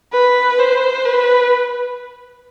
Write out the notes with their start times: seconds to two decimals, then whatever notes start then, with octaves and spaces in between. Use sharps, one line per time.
0.13 B4
0.59 C5
1.05 B4